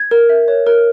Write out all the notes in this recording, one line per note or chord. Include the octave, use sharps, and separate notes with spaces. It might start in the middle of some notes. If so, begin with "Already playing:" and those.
Already playing: G#6
A#4
E5
C#5
A#4